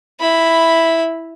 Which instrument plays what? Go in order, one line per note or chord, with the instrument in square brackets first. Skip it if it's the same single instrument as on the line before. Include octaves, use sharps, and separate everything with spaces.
[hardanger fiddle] E4 B5